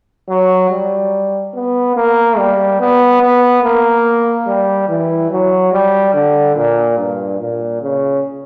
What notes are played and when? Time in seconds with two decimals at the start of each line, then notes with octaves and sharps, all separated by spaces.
0.29 F#3
0.70 G3
1.54 B3
1.97 A#3
2.37 G3
2.80 B3
3.22 B3
3.63 A#3
4.47 G3
4.89 E3
5.31 F#3
5.72 G3
6.14 D3
6.56 A#2
6.98 G2
7.40 A#2
7.82 C#3